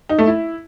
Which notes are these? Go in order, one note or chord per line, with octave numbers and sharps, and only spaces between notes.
D#4
A3
E4